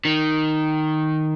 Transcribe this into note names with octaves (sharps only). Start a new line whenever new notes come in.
D#3